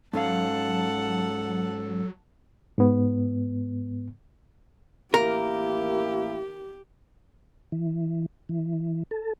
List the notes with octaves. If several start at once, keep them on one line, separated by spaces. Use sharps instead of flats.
G#2 F#3 C#4 A4 F5 F#5 A5
G#2 B3
A1 A#3 E4 G4 A#4
E3
E3
A4